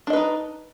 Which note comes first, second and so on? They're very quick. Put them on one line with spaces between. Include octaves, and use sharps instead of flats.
D4 D#5 B4 D#4